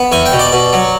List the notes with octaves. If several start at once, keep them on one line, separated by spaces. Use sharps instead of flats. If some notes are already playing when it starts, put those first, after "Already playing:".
Already playing: B3
E2 G#5
G5
B2
D5
B2
F#3